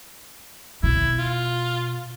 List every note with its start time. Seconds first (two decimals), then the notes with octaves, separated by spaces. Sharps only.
0.83 B2 E4
1.18 F4